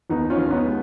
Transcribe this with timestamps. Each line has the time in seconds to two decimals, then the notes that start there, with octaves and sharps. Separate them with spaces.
0.10 D#2 B3 D#4
0.30 C#4 F4
0.37 D#2
0.50 B3 D#4
0.64 G#3